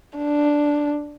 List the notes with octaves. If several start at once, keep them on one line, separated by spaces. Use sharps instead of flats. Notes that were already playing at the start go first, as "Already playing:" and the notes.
D4